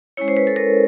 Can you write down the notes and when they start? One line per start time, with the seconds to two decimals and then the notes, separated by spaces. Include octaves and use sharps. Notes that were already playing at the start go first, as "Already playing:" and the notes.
0.17 G#3 C#4 E4 C#5
0.28 C5
0.37 B4
0.47 A4
0.56 A#4